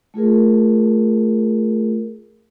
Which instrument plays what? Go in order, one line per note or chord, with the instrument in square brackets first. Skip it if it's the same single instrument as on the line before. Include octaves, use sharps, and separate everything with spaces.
[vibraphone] A3 F4 G#4 A#4